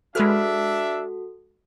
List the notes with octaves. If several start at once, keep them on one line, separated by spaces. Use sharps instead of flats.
G#3 D4 F#4 A4 B4 E5 F6